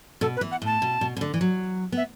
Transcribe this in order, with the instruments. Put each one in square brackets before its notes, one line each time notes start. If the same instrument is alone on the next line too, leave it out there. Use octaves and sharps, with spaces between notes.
[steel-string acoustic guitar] B2 [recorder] A4
[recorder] B4
[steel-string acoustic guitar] E3
[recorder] F#5
[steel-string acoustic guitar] A2 [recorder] A5
[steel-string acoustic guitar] B2
B2
B2
D3
E3
F#3
B3
[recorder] E5